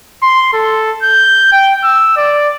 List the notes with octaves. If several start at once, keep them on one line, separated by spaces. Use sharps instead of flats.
C6
A4
G6
G5
E6
D5